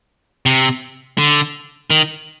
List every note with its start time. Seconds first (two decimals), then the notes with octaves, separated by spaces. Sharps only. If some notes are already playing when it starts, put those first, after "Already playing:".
0.46 C3
1.18 D3
1.90 D#3